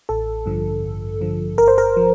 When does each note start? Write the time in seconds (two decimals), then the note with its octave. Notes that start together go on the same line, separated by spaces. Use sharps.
0.09 A1 A4
0.46 G2 D3 F3
0.83 A1
1.21 G2 D3 F3
1.57 G1 A#4
1.68 C5
1.78 A#4
1.97 F3